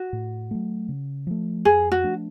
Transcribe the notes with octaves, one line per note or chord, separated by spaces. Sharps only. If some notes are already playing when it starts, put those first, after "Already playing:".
Already playing: F#4
A2
F#3 A3
C#3
F3 A3
F2 G#4
F#4
F3 A3 D4